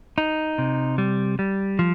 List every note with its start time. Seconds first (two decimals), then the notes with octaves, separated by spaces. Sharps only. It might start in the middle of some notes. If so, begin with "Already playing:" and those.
0.18 D#4
0.58 C3
0.98 G3
1.39 G3
1.79 F3